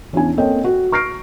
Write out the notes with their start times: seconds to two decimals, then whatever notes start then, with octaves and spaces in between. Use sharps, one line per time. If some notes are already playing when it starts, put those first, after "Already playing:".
0.13 E2 C#4 D4 E4 G#5
0.37 A#3 C4 A4 C#5 D#5 G5
0.64 F#4
0.92 C#6 F6 A#6 C7 D7